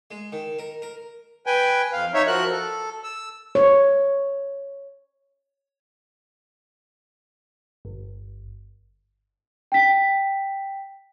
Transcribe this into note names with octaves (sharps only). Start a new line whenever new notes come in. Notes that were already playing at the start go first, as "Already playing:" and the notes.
G#3
D#3
A#4
A#4
B4 G5 G#5
F2 F5
D#4 C#5 E5
F3 F#4 A#4 F#6
A4
E6
C#5
G1
G5 B6